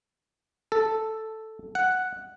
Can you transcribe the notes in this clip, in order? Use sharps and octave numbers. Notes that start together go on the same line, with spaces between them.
A4
F#5